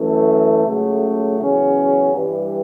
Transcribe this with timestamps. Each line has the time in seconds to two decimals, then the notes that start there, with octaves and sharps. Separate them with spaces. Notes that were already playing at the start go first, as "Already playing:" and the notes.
Already playing: F#2 E3 A3
0.64 C#2 C#3 F#3 A3
1.38 E2 C#3 F#3 C#4
2.11 G2 E3 G3